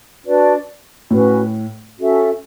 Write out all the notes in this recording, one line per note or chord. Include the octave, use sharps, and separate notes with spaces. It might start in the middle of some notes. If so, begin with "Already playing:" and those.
D4 F#4 B4 D5
A2 C#4 F#4 B4
C#4 F#4 A4 E5